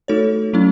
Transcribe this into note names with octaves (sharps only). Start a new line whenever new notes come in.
A3 D#4 F#4 A4 C#5
F#3 A3 C#4 E4